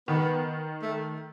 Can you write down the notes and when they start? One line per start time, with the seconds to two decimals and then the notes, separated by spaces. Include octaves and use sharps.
0.08 D#3 B3
0.82 A3